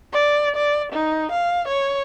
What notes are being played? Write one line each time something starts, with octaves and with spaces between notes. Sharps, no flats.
D5
D5
D#4
F5
C#5